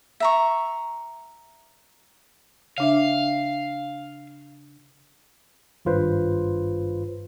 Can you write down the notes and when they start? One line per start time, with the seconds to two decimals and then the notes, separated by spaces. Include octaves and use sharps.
0.20 E5 A#5 C#6
2.78 C#3 D4 E5 F5
5.85 G#1 G2 F4 B4 C5